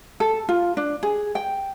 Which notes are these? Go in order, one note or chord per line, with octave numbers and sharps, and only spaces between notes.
A4
F4
D4
G#4
G5